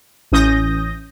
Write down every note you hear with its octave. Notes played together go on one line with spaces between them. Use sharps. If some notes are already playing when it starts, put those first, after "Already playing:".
A1 E3 C#4 D#6 G6 A#6